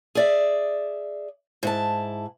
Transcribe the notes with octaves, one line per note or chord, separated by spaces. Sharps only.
G#4 D5 E5
G#2 E4 A5